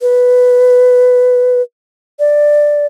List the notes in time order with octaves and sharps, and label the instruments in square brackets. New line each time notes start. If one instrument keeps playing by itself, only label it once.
[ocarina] B4
D5